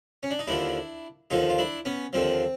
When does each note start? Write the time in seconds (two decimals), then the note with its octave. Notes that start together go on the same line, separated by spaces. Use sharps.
0.23 C#4
0.31 D4
0.39 D#4
0.47 D#2 D3 F3 D4 E4
1.30 D#2 D3 F3 D#4 F4
1.49 F4
1.58 D4 E4
1.85 B3 C#4
2.13 D#2 D3 F3 C4